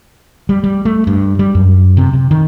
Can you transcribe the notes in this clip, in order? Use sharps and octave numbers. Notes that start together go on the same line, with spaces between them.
G3
G3
A3
G2
G3
F#2
C3
C3
D#3